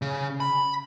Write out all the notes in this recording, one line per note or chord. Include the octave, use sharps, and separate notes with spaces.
C#3
B5